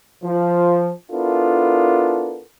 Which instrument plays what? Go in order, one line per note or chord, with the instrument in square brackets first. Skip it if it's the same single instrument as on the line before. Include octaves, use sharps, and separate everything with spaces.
[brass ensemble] F3
B3 D4 E4 F4 A4 A#4